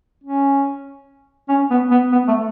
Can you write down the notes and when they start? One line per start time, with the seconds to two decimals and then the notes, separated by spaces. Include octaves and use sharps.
0.24 C#4
1.49 C#4
1.70 B3
1.91 B3
2.12 B3
2.28 A3